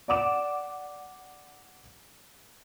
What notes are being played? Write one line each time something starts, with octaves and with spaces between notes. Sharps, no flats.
D5 F#5 D6 E7